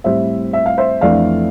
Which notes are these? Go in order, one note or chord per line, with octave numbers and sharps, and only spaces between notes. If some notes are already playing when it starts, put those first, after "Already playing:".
A2 G3 C4 C5 E5
E5
F5
C5 E5
F2 E3 A3 D4 D5 F5